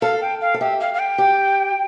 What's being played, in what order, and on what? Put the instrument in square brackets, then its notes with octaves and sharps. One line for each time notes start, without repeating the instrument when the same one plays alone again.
[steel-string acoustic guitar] A4 [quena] F5
[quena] G5
F5
[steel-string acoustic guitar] A4
[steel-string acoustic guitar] G4 [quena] E5
[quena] F5
F5
G5
[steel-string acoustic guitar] G4